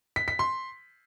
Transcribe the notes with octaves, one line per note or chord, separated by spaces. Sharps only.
B6
B6
C6